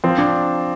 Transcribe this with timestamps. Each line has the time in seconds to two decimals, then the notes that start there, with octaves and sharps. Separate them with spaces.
0.04 F3 C4
0.18 D4